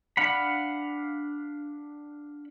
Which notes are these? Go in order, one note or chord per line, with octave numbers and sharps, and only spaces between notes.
D4 F5 F#5 B5